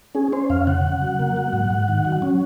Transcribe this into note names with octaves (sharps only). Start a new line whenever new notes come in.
C#4 G#4
C#4 C5
F2 F5
C#3 F#5
C#3
F#3
A#3
F#3
G#2
G#2
D#3
F#3
C#4